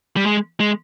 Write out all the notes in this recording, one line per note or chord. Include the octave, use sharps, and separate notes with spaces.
G3
G#3
G#3